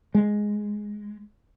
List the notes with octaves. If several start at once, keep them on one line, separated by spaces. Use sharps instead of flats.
G#3